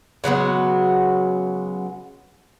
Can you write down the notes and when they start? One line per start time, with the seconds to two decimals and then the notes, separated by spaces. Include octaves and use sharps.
0.24 C#3 F#3 G#3 B3